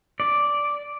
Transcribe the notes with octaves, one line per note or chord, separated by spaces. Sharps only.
D5